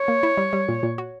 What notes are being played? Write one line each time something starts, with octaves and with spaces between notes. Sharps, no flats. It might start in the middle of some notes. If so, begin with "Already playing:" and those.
Already playing: C#5
A#3
E4
G3
G3
A#2
A#2
F#4